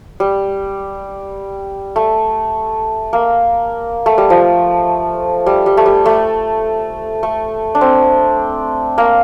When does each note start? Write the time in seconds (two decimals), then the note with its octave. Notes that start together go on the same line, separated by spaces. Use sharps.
0.20 G3
1.96 A3
3.13 A#3
4.06 A3
4.18 G3
4.30 F3
5.46 G3
5.66 G3
5.77 A3
5.86 G3
6.06 A3
7.23 A3
7.75 D4
7.81 C4
8.98 A#3